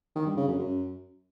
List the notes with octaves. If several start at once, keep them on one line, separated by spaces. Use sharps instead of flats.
D#3
G2
C#3
F#2
F#2